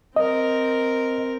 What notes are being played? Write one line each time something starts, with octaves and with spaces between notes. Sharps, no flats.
C4 A#4 D#5